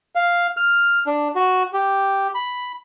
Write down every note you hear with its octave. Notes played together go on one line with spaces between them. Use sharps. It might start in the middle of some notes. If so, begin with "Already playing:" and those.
F5
F6
D4
F#4
G4
B5